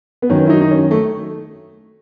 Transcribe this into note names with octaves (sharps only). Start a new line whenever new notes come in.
B3
F#2 D#3 C#4
E4
D#4
D#4
C#4
A3